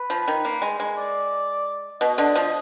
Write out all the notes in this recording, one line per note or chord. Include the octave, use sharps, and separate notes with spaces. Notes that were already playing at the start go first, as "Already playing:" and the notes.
Already playing: B4
F3
D#3
A#3
G#3
G#3
D5
B2 D#5
D3
F3